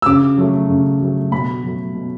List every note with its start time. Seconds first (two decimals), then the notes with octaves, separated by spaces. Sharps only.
0.02 E6
0.06 C#3 D6
0.37 F#3 A3
0.69 C#3
1.01 F#3 A3
1.31 B2 B5
1.63 F#3 A3
1.95 B2